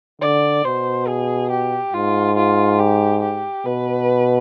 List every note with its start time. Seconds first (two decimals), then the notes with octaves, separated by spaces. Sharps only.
0.21 D3 D5
0.64 B2 C5
1.08 G#4
1.51 G4
1.93 G#2 F4
2.36 F4
2.79 G4
3.22 G4
3.65 B2 B4